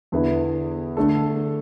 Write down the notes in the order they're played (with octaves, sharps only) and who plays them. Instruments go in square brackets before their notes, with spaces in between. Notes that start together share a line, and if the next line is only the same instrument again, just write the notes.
[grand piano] E2 D3 B3 E4
D3 A3 D4 A4